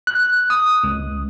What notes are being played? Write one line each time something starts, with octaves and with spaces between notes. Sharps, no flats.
F#6
D#6
C#2